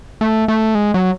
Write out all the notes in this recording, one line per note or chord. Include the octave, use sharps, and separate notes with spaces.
A3
A3
G#3
F#3